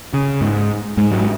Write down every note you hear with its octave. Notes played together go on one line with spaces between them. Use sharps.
C#3
G#2
G#2 G#3
F#3